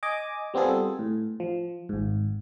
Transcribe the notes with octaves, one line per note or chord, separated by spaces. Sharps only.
D#5 G#5 D6
G3 B3 C4 F4 G#4 A4
A2
F3
G#1 G#2